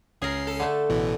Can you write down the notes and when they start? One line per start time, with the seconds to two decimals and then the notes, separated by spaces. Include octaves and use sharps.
0.22 C#2 C#4 G#4 A#4 C7
0.47 A4
0.60 D3 A3
0.89 A1 B2 E3